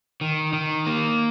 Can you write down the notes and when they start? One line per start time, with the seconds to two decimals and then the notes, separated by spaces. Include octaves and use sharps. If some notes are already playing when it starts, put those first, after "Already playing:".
0.21 D#3
0.53 D#3
0.86 A#3